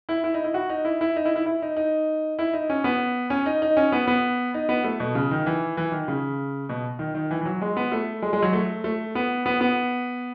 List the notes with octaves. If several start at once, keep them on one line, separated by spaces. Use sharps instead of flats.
E4
E4
D#4
E4
F#4
D#4
E4
E4
D#4
E4
E4
E4
D#4
D#4
E4
D#4
C#4
B3
C#4
D#4
D#4
C#4
B3
B3
D#4
B3
A3
B2
C#3
D#3
E3
E3
D#3
C#3
B2
D#3
D#3
E3
E3
F#3
G#3
B3
A3
G#3
G#3
F#3
A3
A3
B3
B3
B3